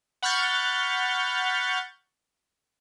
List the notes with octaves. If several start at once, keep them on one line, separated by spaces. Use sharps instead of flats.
F#5 B5 C#6 F6 G6 A6